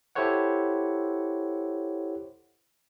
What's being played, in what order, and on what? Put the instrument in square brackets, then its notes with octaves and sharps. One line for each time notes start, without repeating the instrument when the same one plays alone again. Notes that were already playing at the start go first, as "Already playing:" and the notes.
[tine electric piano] E4 G4 A4 C5 C#5 F#5